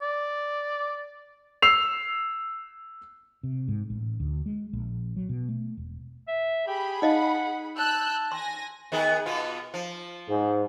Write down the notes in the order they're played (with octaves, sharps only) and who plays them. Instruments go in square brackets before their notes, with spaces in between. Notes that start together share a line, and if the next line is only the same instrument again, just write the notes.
[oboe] D5
[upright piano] E6 C7 F7
[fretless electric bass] C3
G#2
A1
D2
G#3
A#1
F#3
B2
A3
E1
[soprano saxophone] E5
[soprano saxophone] G4 [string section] G#4 B5
[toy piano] D#4 D#5 F5 [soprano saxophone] F#5
[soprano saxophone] A5 [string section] E6 F#6 G6
[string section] G#5 A#6 [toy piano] C6
[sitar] D#3 B3 G#4
B2 B3 F4
F3
[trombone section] G#2